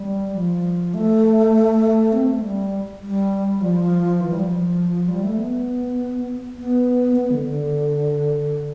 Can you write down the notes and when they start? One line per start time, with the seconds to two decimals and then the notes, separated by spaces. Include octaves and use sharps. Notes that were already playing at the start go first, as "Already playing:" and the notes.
Already playing: G3
0.35 F3
0.94 A3
2.12 C4
2.28 A3
2.42 G3
3.02 G3
3.61 F3
4.20 E3
4.30 G3
4.39 F3
5.08 G3
5.24 A3
5.38 B3
6.57 B3
7.16 B3
7.31 D3
7.46 D3